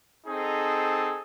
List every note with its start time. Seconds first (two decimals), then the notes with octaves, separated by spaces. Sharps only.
0.26 C4 D#4 G#4 A4